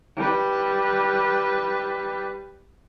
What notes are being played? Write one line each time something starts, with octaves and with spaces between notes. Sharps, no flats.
G3 B4